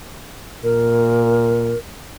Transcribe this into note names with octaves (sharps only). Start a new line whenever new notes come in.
A#2 A#4